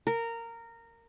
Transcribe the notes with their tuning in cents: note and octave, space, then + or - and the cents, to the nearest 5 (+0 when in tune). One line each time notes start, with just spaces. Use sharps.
A#4 -15